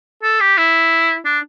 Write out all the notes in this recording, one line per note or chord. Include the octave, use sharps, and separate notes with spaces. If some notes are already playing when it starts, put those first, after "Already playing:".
A4
G4
E4
D4